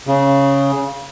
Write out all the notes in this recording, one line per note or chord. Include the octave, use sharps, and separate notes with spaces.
C#3